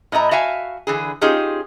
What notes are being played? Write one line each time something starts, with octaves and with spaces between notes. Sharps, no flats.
A2 D#5 E5 A#5
F#4 E5 F5 G#5
D3 E3 G#4
C#4 D#4 F4 G4 G#4